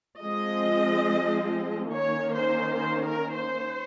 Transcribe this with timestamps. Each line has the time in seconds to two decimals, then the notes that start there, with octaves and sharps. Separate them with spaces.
0.21 F3 G#3 C4 D#5
1.92 D#3 A#3 C#4 C#5
2.35 C5
2.78 C5
3.06 A#4
3.34 C5